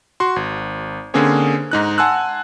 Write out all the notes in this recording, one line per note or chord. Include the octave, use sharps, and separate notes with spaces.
F#4 C6
G#1
D3 A#3 C4 C#4 G#4 C#5
G#2 D#4 F#6
F#5 G#5 A5 C6 E6 F#6